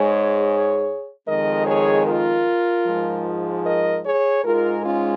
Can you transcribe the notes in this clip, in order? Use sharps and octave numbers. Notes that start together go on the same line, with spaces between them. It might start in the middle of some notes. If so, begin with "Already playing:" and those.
Already playing: G#2 G#3 G#4 C#5
F2 D#3 G#3 A#4 D#5
G#4 C#5
F4 A#4
G#2 F3 G#3
A#4 D#5
G#4 C#5
G#2 G#3 F4 A#4
C#4 F4